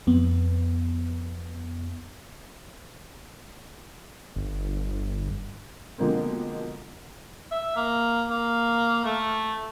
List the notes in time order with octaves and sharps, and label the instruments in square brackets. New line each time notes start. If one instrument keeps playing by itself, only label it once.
[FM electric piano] F2 B3
[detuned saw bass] G1
[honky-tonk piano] B2 D3 F3 G#3 A#3 C4
[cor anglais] E5
A#3
A#3
A3